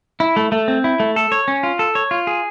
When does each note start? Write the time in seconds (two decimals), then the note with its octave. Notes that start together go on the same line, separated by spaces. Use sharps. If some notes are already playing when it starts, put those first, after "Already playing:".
0.20 E4
0.36 A3
0.52 A3
0.68 C4
0.84 E4
1.00 A3
1.16 A4
1.32 C#5
1.48 C#4
1.63 F4
1.79 A4
1.95 C#5
2.11 F4
2.27 G#4